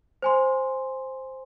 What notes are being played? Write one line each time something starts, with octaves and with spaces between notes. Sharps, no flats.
C5 G#5 C6